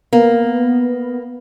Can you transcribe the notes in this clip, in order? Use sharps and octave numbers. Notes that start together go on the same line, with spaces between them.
A#3 B3